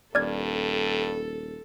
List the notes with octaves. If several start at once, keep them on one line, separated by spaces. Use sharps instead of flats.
D#1 G2 A4 D5 F6 G#6